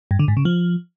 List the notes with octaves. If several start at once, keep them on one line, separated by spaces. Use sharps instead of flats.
G2
D3
G#2
C#3
F3